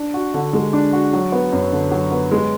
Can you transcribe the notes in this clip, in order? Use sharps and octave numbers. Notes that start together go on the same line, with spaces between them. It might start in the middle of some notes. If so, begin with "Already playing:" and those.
Already playing: D4
F#4
D3
G#3
D4
F#4
F#3
B3
F#2
D3
F#3
B3
G#3